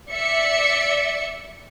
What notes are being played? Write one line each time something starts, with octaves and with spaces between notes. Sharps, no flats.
D5 E5 C#7